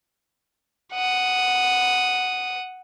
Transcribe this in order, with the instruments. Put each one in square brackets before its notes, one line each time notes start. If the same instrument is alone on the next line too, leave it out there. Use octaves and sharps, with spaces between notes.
[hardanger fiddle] F#5 D#6